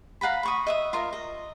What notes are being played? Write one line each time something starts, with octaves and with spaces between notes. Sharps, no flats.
F5 F#5 A#5 B5
B5 C#6 D#6
D#5 E5 D#6
F4 A#4 D#5
D#5